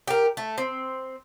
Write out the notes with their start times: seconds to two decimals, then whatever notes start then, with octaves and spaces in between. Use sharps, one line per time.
0.07 G4 A#4
0.37 A3
0.58 C4